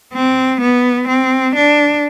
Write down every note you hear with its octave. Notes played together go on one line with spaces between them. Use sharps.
C4
B3
C4
D4